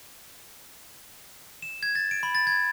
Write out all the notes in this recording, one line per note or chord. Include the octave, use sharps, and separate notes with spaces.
E7
G#6
A6
D7
B5
A6
G#6